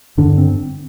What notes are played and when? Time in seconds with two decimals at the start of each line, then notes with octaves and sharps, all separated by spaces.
0.18 G2 D3 D4
0.38 C4